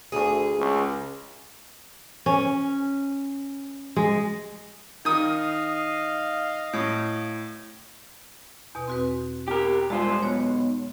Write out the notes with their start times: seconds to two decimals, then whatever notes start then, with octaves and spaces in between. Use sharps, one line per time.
0.12 D2 G#4
0.58 C#2
2.26 C#4
3.96 G#3
5.05 D#3 D#5 F5 D#6
6.73 A2
8.75 E2 B2
8.88 C4 F#4 B4
9.48 G4 A#4
9.90 G2 G#3 F4 C5
10.23 B1 C#5